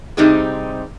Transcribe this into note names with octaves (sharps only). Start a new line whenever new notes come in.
C3 G3 C4 D#4 G4 G#4